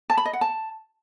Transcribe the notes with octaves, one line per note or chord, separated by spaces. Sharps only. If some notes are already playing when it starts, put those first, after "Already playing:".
A5
B5
D#5
F#5
A5